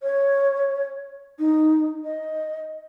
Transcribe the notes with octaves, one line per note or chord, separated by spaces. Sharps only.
C#5
D#4
D#5